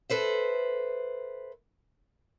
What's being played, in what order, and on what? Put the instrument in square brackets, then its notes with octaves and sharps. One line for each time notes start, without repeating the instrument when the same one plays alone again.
[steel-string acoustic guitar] A4 B4 C5 E5